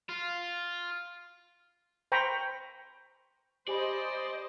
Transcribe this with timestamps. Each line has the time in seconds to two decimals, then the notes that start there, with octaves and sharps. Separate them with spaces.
0.09 F4
2.12 C5 G5 A#5 B5 C#6
3.68 G4 C5 D5 D#5 G#5 B5